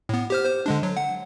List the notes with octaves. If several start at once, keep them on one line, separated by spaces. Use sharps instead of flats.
A2 B3
G4 C5 F6
C5
D3 G#3 D4
F#3
F#5